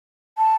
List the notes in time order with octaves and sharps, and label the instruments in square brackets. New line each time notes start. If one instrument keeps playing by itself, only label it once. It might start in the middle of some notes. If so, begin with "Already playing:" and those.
[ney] A5